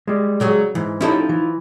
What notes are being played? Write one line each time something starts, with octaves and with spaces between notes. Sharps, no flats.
G3 G#3
C#3 F#3 G#4
G#2 E3
F3 C#4 D#4 E4 G4 A4
E3